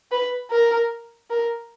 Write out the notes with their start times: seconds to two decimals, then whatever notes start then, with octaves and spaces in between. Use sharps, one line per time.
0.11 B4
0.50 A#4
1.30 A#4